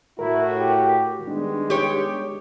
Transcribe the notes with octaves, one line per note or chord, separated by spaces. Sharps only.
A2 E4 F#4 A#4
G4
D#3 G3 G#3 B3 D4
G4 C#5